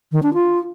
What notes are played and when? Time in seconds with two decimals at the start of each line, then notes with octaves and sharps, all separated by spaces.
0.12 D#3
0.23 D4
0.34 F4